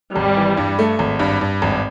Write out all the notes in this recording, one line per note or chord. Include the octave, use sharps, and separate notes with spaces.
G#1 G3
E3
G2
A3
G#1
G2
G2
G#1